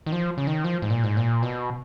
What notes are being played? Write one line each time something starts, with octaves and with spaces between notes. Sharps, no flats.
D#3
F3
C#3
D#3
F3
G#2
A#2
G#2
A#2
B2